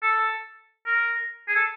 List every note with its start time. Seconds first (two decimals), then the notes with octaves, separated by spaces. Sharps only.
0.03 A4
0.86 A#4
1.48 G#4
1.55 A4